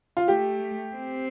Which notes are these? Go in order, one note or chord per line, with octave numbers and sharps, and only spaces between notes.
F4
A3 G4
C4